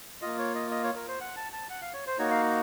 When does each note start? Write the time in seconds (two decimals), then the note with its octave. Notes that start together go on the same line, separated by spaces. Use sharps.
0.22 A#3 F4 D#5
0.38 C#5
0.55 D#5
0.71 D#5
0.84 C#5
0.95 A#4
1.08 C5
1.21 F#5
1.36 A5
1.53 A5
1.70 F#5
1.82 F5
1.93 C#5
2.07 C5
2.19 A#3 D#4 F#4 C#5
2.31 F5